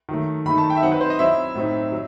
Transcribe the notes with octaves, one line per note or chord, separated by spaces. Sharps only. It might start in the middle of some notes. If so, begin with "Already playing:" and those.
D#3 F#3 A3
D#3 F#3 A3 D#4 B5
A5
G5
E5
F#3 C4 D#4 F#5
B4
C5
D#5
F#3 C4 E4 E5
A2 F#3 C4 D#4
F#3